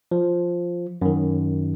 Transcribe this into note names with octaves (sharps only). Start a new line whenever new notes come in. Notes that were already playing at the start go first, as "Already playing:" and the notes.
F3
F#2 D#3